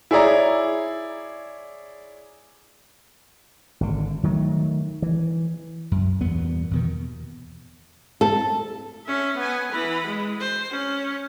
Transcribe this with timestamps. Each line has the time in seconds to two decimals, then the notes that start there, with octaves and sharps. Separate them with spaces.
0.11 E4 G#4 C#5 D5 A#5
3.80 G#1 D3
4.23 D#3 F#3 G3 A3
5.02 E3
5.91 F#2
6.21 E2 G2 A#2 B3
6.71 E2 B2 D#3
8.21 A4
9.06 C#4 E5
9.37 B3 G#5
9.71 E3 B5
10.07 G#3
10.40 C5
10.71 C#4